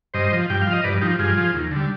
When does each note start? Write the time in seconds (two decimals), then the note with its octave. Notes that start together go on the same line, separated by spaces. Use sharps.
0.14 G2 C5 D#5
0.32 F3
0.50 G2 G5
0.62 F5
0.67 F3
0.73 D#5
0.84 G2 B4 D5
1.01 F3 D#4 G4
1.19 G2 F4 G#4
1.37 F3
1.54 D#2
1.71 D3 G3